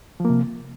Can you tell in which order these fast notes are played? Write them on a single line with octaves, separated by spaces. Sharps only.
F3 A#3 C3